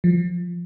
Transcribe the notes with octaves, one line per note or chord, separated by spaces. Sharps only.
F3